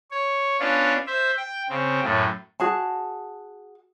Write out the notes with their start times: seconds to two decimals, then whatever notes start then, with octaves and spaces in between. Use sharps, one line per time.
0.11 C#5
0.60 B3 C#4 D4 F4
1.07 C5 E5
1.37 G5
1.69 C#3 C4
2.03 F#2 A2
2.60 F#4 G#4 A5